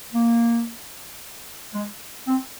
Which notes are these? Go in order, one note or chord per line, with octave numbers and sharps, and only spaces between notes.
A#3
G#3
C4